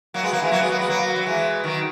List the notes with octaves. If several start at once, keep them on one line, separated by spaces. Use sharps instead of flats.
F#3 A#3
G#3 B3
F#3 A#3
E3 G#3
F#3 A#3
G#3 B3
F#3 A#3
G#3 B3
F#3 A#3
F#3
E3 G#3
D#3 F#3